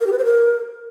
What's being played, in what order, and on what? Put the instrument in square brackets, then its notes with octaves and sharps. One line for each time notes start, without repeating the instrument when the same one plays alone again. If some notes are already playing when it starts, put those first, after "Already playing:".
[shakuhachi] A#4
G4
B4
C5
A#4